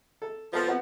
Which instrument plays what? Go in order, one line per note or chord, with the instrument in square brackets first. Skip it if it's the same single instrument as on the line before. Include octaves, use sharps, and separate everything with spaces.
[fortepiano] A4
[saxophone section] F3 [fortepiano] B3 A4
[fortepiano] B3 C4 F#4